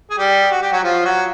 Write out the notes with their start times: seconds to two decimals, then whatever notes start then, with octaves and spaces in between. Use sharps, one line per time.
0.10 G#4
0.18 G3 G4
0.51 F#4
0.62 G4
0.72 F#3 F#4
0.83 F3 F4
1.05 F#3 F#4